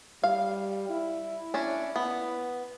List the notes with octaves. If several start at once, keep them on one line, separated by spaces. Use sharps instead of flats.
G3 F5
E4
C#4 D4
B3